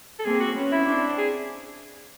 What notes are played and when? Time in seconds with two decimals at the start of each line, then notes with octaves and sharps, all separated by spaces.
0.19 A4
0.25 A#3 C4 G#4
0.40 F#4
0.55 B3 C#4
0.72 E4
0.86 C4 D4
1.18 G#4